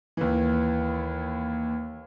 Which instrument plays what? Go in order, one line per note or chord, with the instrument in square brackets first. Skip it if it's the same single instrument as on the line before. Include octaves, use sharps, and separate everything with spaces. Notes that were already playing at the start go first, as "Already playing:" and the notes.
[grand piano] D#2 E3